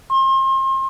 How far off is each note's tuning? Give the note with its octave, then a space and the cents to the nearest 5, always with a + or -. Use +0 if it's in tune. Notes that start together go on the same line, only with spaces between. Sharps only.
C6 +35